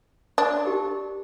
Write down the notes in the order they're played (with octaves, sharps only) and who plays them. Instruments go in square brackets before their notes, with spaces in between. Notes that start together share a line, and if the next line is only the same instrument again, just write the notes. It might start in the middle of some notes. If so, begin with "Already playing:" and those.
[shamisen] D4
[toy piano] D#4 G4 A#4